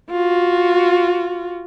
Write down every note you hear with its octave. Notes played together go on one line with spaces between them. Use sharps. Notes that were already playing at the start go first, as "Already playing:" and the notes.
F4 F#4